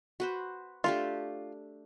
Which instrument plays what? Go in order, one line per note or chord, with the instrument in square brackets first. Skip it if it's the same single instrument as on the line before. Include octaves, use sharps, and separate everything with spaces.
[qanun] F#4 B4 C5
[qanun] A3 D4 G4 [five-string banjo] F4